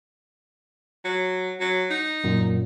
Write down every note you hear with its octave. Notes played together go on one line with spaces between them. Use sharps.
F#3
F#3
D#4
F#2 A#2